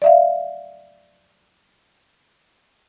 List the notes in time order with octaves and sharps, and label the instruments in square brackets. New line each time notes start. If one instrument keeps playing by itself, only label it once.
[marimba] D5 E5 F5